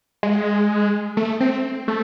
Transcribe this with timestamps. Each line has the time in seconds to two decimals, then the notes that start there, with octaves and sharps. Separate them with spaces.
0.23 G#3
1.17 A3
1.40 C4
1.88 A3